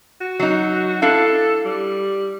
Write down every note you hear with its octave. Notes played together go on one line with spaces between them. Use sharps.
F#4
F#3 D#4
D4 E4 A4 F5
G3